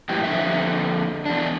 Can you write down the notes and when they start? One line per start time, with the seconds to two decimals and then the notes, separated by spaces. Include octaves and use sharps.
0.09 F#2 A2 E3 G4
0.24 F2 D3 G#3 E5
1.26 E2 D4